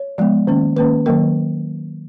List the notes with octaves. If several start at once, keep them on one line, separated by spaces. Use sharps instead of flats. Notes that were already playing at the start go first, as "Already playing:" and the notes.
Already playing: C#5
F3 G#3 B3
D#3 A#3 C#4
D#3 A#3 C#4 B4
D#3 F#3 A#3 A#4